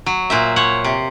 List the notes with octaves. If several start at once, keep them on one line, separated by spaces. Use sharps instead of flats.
F#3
A#2 C5 E5
C5 C#5 F#5
C3